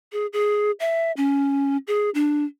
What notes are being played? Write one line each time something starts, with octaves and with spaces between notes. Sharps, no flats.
G#4
G#4
E5
C#4
G#4
D4